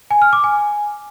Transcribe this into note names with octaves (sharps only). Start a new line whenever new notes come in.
G#5
F6
D6
G#5